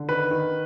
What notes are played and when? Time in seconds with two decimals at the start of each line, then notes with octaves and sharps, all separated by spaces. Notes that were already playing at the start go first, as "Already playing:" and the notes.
Already playing: D3
0.09 D#3 B4
0.31 D#3